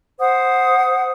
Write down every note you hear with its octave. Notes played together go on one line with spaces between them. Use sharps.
C5 F#5 D#6